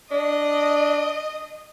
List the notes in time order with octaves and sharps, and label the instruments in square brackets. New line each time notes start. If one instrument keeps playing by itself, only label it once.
[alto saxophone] D4 [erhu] D#5